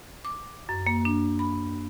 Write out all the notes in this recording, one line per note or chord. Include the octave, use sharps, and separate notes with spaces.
D6
F#2
A#3
D4
B5